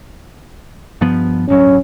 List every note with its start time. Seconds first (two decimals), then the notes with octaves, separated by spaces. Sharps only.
1.01 G2 F3 B3
1.49 D1 G1 F#3 C#4